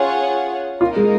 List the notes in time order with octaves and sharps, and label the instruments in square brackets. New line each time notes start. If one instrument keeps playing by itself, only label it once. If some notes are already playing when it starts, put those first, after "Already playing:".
Already playing: [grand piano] C#4 [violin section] F4 G#4 C#5 F#5
[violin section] A#3 D#4 A#4 [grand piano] F4
[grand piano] G#3